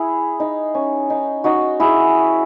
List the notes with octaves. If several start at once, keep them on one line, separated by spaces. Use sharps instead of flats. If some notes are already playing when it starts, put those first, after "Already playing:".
Already playing: E4 G#4
D#4
C#4
D#4
D#4 F#4
E4 G#4